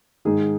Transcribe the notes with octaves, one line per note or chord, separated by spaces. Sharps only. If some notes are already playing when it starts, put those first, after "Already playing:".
G#2 D#3 G#4